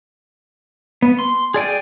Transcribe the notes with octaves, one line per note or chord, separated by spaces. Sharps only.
B3
C6
G#4 D5 G5 G#5